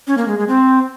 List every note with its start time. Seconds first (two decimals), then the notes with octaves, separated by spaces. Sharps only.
0.07 C#4
0.18 A#3
0.28 G#3
0.38 G#3
0.48 C4